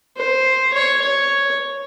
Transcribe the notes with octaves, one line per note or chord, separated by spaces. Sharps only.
C5
C#5
C#5